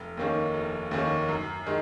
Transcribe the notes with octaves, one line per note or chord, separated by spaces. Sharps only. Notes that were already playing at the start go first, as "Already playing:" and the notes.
Already playing: F1
D#2 D#3 A#3 C#4
F1
D#2 D#3 A#3 C#4
F#2
D#3 G#3